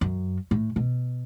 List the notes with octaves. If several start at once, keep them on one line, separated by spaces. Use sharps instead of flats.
F#2
A2
B2